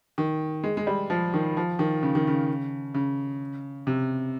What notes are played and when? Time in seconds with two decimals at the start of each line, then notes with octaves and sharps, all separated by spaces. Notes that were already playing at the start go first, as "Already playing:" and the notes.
0.18 D#3
0.64 G#3
0.77 G#3
0.87 G3
1.10 F3
1.34 D#3
1.57 F3
1.79 D#3
2.03 C#3
2.15 D#3
2.27 C#3
2.94 C#3
3.87 C3